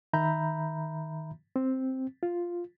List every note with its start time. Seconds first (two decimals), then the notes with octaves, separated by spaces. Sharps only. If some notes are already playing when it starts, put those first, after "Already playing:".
0.13 D#3 E5 A#5 B5 G6
1.56 C4
2.23 F4